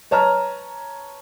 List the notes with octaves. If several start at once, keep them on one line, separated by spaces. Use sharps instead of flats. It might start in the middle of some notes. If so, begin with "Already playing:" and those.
B4 C#5 A5 A#5 F6